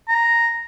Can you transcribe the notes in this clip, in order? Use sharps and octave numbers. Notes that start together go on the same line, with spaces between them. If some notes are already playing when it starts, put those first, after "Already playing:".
A#5